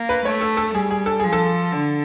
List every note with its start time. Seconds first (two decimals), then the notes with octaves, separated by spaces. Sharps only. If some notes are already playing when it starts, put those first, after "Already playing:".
Already playing: A#3
0.09 B4
0.25 A3 C#5
0.41 A4
0.57 A4
0.74 G3 G#4
0.90 G#4
1.06 A4
1.20 F3 G#4
1.33 A4
1.72 D3